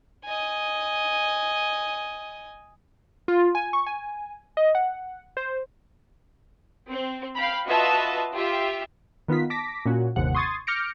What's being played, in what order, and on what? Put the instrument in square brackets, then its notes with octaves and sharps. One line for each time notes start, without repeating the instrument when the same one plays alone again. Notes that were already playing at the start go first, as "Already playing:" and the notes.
[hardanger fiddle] D#5 G#5
[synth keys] F4
G#5
C#6
G#5
D#5
F#5
C5
[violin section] C4
F5 G5 B5
F4 F#4 B4 D#5 E5 A5
F4 G4 E5
[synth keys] D#3 B3 D#4 F4 B6
A5 D6 A#6 B6
A#2 C#4 F#4
G1 D#2 C3 F#5
C6 C#6 D#6 G#6 A6 C7
D6 F6 G6 A#6 C#7 D7